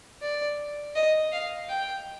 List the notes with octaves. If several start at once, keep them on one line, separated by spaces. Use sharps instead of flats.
D5
D#5
F5
G5